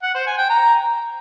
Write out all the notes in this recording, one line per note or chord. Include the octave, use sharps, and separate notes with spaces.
F#5
C5
G#5
G5
A#5